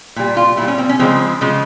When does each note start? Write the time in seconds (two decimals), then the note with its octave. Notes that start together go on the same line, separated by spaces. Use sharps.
0.16 A#2 G3
0.37 F4
0.57 A#2 E4
0.62 G3
0.68 C#4
0.78 C4
0.89 C#4
0.99 C#3 F3 G#3 C4
1.41 C#3 F3 G#3